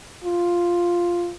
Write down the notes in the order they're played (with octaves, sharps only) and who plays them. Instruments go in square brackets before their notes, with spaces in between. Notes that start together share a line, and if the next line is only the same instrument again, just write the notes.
[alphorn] F4